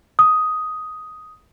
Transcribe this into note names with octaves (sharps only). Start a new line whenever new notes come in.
D#6